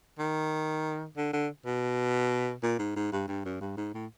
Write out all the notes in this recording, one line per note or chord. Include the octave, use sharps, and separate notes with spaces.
D#3
D3
D3
B2
A#2
G#2
G#2
G2
G2
F#2
G2
G#2
A2